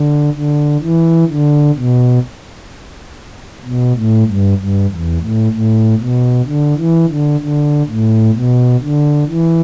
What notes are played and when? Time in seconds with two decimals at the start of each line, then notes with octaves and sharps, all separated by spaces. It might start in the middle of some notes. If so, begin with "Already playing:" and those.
Already playing: D3
0.35 D3
0.82 E3
1.29 D3
1.76 B2
3.65 B2
3.95 A2
4.27 G2
4.58 G2
4.90 E2
5.21 A2
5.52 A2
5.99 B2
6.46 D3
6.77 E3
7.09 D3
7.41 D3
7.88 A2
8.34 B2
8.82 D3
9.28 E3